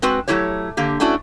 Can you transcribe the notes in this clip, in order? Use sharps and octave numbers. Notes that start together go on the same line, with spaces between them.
G#3 C4 F#4 B4
F#3 A3 E4 G4 C#5
D3 A#3 G4
A3 C#4 D4 E4 F#4